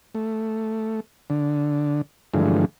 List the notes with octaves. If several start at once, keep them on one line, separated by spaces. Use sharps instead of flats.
A3
D3
G2 D3 E3 F3 G#3 A3